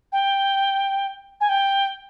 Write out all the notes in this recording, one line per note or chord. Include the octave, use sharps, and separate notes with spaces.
G5
G#5
G5